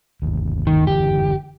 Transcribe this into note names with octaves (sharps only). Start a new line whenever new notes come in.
G1 D#2
D#3
F#1 D3 E3 G4